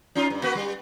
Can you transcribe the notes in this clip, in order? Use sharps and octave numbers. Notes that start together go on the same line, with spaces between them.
C#4 D#4 F4
G2
A#3 F#4 B4
G3